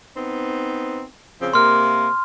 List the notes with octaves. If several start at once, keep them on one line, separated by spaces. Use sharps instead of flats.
B3 C4 D#4
C#3 F3 C4
C3 A#3 C6 F6